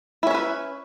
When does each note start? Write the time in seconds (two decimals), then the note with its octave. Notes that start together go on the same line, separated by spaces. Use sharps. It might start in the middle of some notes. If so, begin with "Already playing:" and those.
0.23 E4
0.27 C#4
0.31 E5
0.35 B4